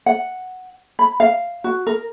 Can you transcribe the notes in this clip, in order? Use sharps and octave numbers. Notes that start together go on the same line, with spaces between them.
F#5
B5
F5
F#4
A#4